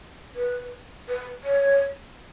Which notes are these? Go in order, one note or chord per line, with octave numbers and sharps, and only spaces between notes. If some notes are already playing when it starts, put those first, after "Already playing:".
B4
B4
C#5